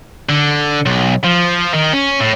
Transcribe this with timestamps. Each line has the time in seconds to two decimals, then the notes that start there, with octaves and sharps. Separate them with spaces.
0.29 D3
0.86 B1
1.24 F3
1.74 D#3
1.93 C#4
2.20 A2